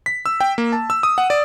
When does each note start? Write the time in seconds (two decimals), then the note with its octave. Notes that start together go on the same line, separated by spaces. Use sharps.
0.06 B6
0.26 E6
0.41 G5
0.58 A#3
0.73 A5
0.90 E6
1.03 D#6
1.18 F#5
1.30 D5